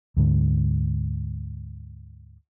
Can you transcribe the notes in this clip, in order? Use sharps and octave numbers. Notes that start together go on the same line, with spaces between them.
D2 G#2 D3